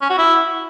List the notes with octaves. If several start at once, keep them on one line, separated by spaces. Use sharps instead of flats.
C#4
F#4
E4